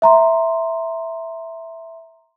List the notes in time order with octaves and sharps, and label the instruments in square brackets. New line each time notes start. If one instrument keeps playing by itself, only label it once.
[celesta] E5 A#5 C6